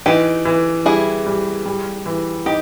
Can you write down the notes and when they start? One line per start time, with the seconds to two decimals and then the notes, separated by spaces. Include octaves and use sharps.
0.06 E3 D#4 G4
0.45 E3
0.85 G3 E4 G#4
1.27 G3
1.66 G3
2.06 E3
2.46 D#4 G4